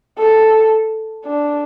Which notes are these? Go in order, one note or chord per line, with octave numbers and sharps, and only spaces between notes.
A4
D4